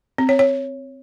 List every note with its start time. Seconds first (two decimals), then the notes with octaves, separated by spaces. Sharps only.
0.18 C4
0.29 C#5
0.39 C#5